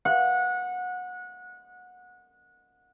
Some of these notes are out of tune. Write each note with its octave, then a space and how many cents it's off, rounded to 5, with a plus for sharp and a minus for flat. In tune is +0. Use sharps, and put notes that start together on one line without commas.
F#5 -25